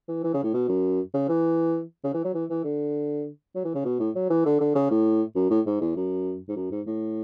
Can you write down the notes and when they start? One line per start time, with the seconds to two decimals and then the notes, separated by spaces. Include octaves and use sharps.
0.08 E3
0.24 E3
0.34 C#3
0.44 A2
0.54 B2
0.69 F#2
1.14 C#3
1.29 E3
2.04 C#3
2.14 E3
2.24 F#3
2.34 E3
2.50 E3
2.64 D3
3.55 F#3
3.64 E3
3.75 C#3
3.85 B2
3.99 A2
4.15 F#3
4.30 E3
4.45 D3
4.60 D3
4.75 C#3
4.91 A2
5.36 F#2
5.50 A2
5.66 G#2
5.81 E2
5.96 F#2
6.49 G#2
6.56 F#2
6.71 G#2
6.87 A2